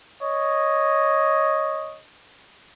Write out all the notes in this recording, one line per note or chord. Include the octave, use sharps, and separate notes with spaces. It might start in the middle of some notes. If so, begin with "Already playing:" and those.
C#5 D#5